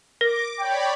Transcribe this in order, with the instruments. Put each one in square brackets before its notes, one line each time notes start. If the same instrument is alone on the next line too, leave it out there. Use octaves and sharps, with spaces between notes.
[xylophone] A#4 [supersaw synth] D6 [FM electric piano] A#6
[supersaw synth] C#5 D5 B5 [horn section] G5